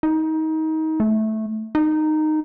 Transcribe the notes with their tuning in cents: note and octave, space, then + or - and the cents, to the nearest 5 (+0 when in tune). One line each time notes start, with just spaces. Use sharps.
D#4 +25
A3 -10
D#4 -10